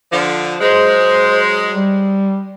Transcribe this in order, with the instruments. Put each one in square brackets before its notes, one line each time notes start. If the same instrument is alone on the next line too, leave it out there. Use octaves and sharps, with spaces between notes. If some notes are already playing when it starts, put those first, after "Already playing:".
[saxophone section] D3 F3
[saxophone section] F#3 G#3 [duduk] C5
[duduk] G3